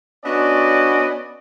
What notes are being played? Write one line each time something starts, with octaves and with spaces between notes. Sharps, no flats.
B3 C#4 D4 F#4 D5 D#5